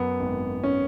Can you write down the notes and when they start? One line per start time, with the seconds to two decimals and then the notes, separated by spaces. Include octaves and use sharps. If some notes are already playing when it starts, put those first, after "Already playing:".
Already playing: F#2 B3
0.20 G#1
0.64 C#4